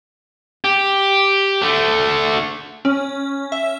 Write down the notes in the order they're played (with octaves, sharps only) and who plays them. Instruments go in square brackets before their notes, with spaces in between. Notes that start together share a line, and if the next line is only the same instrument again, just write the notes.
[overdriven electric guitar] G4
D3 A3
[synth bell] C#4
E5